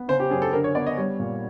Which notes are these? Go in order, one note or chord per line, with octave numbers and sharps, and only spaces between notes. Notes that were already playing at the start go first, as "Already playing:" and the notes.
Already playing: B3
C#3 C5
G4
F#2 G#4
A4
D3 A#4
C#5
B3 D5
D#5
G3 C#5
A#2